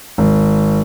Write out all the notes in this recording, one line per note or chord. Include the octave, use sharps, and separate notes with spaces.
G#1